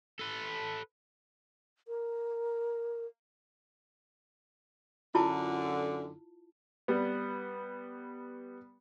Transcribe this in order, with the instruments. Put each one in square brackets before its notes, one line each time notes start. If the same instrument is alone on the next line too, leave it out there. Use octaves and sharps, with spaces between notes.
[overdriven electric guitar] A4 B4
[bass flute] A#4
[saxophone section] F#2 D3 [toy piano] E4 F4 A5
[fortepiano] G3 B3